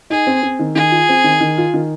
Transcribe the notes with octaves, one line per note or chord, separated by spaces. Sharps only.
D#4 G#4
C4
C4
D#3
D#3 G#4
F4
C4
D#3
D#3
F4
D#3